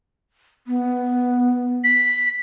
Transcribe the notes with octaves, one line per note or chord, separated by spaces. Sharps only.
B3
B6